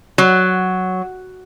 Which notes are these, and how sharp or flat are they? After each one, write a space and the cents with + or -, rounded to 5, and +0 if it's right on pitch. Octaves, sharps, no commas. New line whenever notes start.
F#3 +0